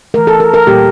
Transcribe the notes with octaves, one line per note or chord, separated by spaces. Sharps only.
E3 A3 A#4
A4
A#4
A#4
A#2 G3 A#3 G4